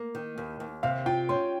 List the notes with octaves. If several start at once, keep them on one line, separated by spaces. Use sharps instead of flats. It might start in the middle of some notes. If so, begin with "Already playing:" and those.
Already playing: A#3
D#3
D#2
D#2
C3 F5
F4 G5
C#4 C6